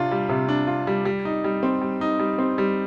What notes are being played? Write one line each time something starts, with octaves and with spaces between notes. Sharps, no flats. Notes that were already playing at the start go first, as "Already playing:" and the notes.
Already playing: C3 D4 F4
G3
C3
D4
F4
G3
G3
D#4
G3
C4
G3
D#4
G3
C4
G3